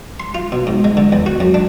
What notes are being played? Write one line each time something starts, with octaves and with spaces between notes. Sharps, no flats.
C6
F4
B2
G#2
G#3
D3
E2
F#4
F#2
D4